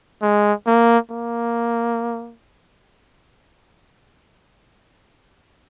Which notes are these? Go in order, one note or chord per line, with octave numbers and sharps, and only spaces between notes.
G#3
A#3
A#3